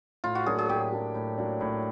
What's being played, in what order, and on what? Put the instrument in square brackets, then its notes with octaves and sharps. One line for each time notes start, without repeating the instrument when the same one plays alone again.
[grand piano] A2 [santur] F4
[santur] F#4
[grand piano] F#3 A#3 D4 [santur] G#4
[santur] G#4
[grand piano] A2 [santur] G4
[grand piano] F#3 A#3 D4
A2
F#3 A#3 D4
A2